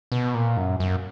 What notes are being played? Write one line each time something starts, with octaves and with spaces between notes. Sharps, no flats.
B2
A#2
F#2
F#2